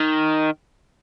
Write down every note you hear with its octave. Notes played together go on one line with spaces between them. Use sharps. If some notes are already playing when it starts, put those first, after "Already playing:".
Already playing: D#3